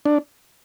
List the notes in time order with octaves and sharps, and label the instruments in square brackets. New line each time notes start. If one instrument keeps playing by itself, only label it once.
[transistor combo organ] D4